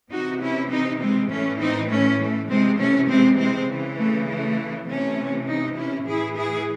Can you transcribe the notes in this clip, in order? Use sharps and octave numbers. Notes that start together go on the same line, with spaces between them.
C3 E3 D#4 F#4
C#4 E4
C4 D#4
G#3 C4
A2 E3 A3 C#4
C4 D#4
A3 C#4
A3
C3 E3 G#3 C4
A3 C#4
G#3 C4
G#3 C4
C#3 E3
A3
A3
C3 E3 A3 C#4
C4 D#4
C#4 E4
A2 E3 E4 G#4
E4 G#4